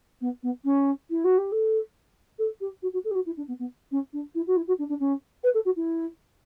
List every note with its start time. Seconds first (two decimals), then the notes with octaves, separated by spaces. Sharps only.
0.20 B3
0.42 B3
0.64 C#4
1.10 E4
1.24 F#4
1.37 G4
1.51 A4
2.38 A4
2.60 G4
2.82 F#4
2.93 F#4
3.04 A4
3.10 G4
3.14 F#4
3.25 E4
3.37 D4
3.47 B3
3.58 B3
3.91 C#4
4.13 D4
4.34 E4
4.47 F#4
4.56 E4
4.67 F#4
4.78 D4
4.88 D4
4.99 C#4
5.43 B4
5.54 A4
5.65 F#4
5.76 E4